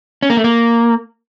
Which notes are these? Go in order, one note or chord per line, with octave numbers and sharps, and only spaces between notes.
C#4
A#3
A3
A#3